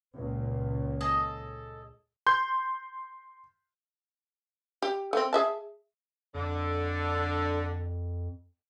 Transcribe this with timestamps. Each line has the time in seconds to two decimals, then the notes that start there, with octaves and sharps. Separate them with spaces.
0.14 C#2 A#2
1.01 G#4 A4 D#5
2.27 C6 G6
4.82 G4
5.13 A3 C4
5.33 G#4 E5 A5
6.34 F2 D3